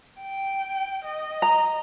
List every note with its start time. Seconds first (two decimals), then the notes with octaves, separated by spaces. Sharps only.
0.20 G5
1.05 D#5
1.42 A#5